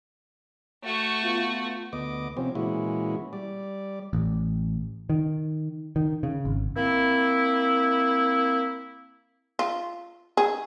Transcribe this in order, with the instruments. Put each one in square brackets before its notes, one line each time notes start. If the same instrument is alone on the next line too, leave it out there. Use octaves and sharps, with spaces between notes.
[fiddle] A3 F#4
[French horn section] B3 F4
[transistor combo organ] D2 B3 D#5 D6
C3 F3 C4 C#4
A#2 E3 G#3 C#4 E4 F#4
G3 D5
[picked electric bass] A1
D#3
D#3
C#3
G#1
[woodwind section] A#3 C4 E4
[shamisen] F4
G#4